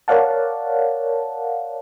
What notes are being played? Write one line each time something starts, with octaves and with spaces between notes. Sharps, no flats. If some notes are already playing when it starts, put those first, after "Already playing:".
A#4 C#5 D5 F5 F#5 A5